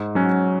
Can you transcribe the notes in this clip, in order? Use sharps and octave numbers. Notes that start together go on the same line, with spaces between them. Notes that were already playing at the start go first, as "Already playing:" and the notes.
Already playing: G#2
F#3 C#4 F#4